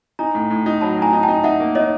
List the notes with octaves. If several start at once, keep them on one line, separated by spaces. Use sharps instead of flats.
D#4 G#5 A#5
A2
A2
D#4
F#3 A5 B5
A2 G#5 A#5
D#4
G5 A5
D#4
D#4 E5 F#5
A#3
D#4 C#5 D#5